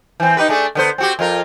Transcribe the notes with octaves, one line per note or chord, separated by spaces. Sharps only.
E3 C4
D#4 G4 B4
A3 D4 G#4
D3 B3 C5
C4 F#4 G4
F2 F4 A#4